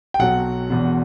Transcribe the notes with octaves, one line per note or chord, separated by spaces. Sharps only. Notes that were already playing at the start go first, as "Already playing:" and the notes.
G5
B1 B2 F#3 F#5
E1 E2 B2